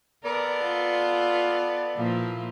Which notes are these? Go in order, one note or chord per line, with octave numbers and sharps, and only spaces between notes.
B3 A4 A#4 D5
F4
A#2 F3 E4